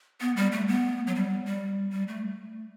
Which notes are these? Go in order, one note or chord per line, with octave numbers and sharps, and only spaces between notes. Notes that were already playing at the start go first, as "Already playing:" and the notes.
B3
G3
A3
B3
F#3
G3
G3
G3
A3